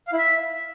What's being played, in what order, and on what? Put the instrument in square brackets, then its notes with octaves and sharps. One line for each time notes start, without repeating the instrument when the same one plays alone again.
[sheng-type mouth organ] F5
E4
E5